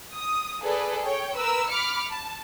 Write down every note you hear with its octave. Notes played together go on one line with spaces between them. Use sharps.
D#6
G#4 A4 B4 D5
C#5 G5
A#4 B4 E6
B5 D6 F6 C#7
A5